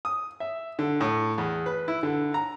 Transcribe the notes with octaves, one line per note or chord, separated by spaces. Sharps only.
D#6
E5
D3
A2
E2
B4
E4
D3
A#5